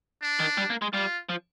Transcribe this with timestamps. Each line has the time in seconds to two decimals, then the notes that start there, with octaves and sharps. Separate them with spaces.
0.22 D4
0.40 D#3
0.58 G3
0.70 A#3
0.82 G#3
0.93 G3 F4
1.29 F3